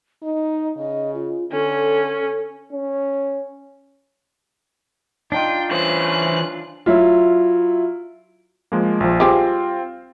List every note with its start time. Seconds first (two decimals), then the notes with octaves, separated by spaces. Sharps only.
0.23 D#4 D#5
0.77 C#3 D#5
1.14 F4
1.52 D3 C#4 A4
2.73 C#4
5.32 D4 D#4 F4 G5
5.72 E3 C#4 C5 F#6
6.86 F#3 E4 F4
8.72 F3 G#3 A#3
9.00 A#1 F3
9.20 G3 C4 F4 G4 G#4